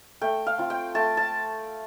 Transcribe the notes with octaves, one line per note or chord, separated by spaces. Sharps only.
A3 G5
F5
C4 F4
G5
A3 A5
A5